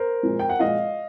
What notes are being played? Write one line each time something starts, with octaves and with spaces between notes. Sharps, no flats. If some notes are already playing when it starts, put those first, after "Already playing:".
Already playing: A#4 C5
A#2 F3 G#3
G5
F#5
A#2 F3 G#3 D#5 F5